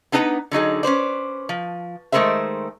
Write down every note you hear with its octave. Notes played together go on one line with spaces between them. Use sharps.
B3 D4 D#4 B4 A5 A#5
D3 F#3 D#4 G#4
C#4 B4 C5 D5
F3
D#3 G#3 A3 A#4 C5 E5